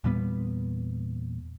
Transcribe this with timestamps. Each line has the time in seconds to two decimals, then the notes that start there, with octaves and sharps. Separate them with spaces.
0.04 E2 A#2 G3 B3